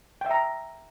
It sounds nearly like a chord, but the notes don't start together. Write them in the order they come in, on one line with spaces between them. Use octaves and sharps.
G5 E5 A#5